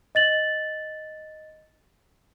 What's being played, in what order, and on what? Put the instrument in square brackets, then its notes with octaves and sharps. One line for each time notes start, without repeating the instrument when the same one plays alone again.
[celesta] D#5 A6 F#7